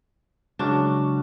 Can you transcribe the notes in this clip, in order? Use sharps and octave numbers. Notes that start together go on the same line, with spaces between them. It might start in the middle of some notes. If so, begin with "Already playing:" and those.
C#3 F#3 G#3 C#4 D4 F#4